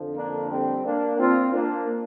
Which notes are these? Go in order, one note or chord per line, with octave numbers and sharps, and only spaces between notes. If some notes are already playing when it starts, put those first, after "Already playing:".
Already playing: F2 D3 F3
A#3 D4
G3 C4
A#3 D4
C4 F4
A#3 D4